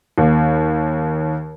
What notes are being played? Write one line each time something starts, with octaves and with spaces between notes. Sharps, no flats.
D#2